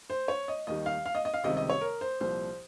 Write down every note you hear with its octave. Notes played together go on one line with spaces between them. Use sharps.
C5
C#5
D#5
D#2 D#3 G3 D#5
F5
F5
D#5
D#5
F5
C#2 C3 D#3 G3 D#5
D#5
C#5
A#4
C5
C2 A#2 F3 C5